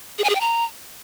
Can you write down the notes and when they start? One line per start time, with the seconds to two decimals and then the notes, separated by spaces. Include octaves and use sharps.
0.19 G#4
0.24 G#5
0.30 G#4
0.35 G5
0.41 A#5